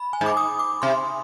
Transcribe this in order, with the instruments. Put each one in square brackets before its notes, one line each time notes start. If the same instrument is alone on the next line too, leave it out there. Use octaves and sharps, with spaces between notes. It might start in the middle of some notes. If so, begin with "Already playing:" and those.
Already playing: [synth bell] B5
G#5
[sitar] G#2
[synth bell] D6
D#6
D6
[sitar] C3 [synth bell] C6